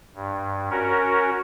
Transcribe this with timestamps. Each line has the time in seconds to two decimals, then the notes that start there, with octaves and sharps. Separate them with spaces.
0.15 G2
0.71 C#4 F#4 A#4